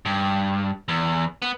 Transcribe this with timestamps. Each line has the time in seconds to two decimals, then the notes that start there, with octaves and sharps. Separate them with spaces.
0.05 G2
0.88 E2
1.42 B3